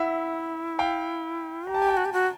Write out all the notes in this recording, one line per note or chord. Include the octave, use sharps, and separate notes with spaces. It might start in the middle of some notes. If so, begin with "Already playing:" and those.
Already playing: E4 E5 F#5
F5 G5
G4 A#5
A5
G#5
G5 A5
F#4
G4
F#4